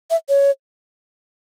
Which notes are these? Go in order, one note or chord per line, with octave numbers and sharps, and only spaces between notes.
E5
C#5